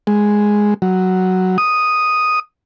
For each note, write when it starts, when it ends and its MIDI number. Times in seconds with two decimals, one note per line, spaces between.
0.07 0.74 56
0.82 1.57 54
1.58 2.40 87